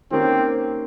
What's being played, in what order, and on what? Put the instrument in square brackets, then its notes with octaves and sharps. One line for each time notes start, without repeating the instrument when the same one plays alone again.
[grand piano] D#3 A#3 C#4 G4 [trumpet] C4